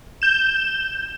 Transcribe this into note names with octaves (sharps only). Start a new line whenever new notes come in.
G6 E7